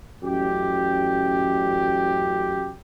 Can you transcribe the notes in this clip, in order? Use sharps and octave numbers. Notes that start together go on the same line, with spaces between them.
A1 F#2 G4